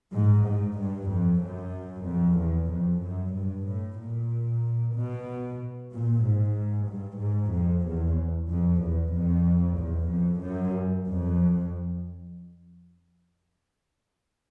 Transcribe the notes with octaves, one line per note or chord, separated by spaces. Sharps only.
G#2
G#2
G2
F2
F#2
F2
E2
F2
F#2
G2
A2
A#2
B2
A#2
G#2
G2
G#2
F2
E2
F2
E2
F2
E2
F2
F#2
F2